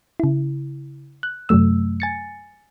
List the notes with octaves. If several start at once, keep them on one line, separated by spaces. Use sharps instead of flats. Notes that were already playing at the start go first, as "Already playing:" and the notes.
C#3 E4
F#6
F#2 C3 F#3 A3 E6
G#5 A6 C#7